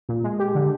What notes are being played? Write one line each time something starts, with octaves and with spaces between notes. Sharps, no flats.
A#2
G#3
G4
D3